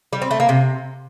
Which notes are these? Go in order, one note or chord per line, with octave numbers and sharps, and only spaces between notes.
G3
C4
A3
A#3
C3